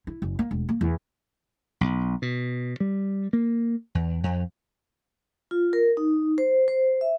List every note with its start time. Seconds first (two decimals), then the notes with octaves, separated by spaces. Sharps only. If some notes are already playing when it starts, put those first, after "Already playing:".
0.07 E4
0.22 F#1
0.39 A#3
0.51 E1
0.69 A#3
0.81 E2
1.81 B1
2.22 B2
2.80 G3
3.33 A#3
3.95 E2
4.23 F2
5.51 F4
5.73 A#4
5.97 D#4
6.38 C5
6.68 C5
7.01 E5